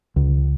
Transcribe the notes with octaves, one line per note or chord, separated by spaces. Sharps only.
C#2